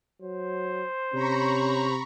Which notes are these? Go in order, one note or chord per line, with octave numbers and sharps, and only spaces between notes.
F#3 C5
C3 C#4 A#5 B5 C#6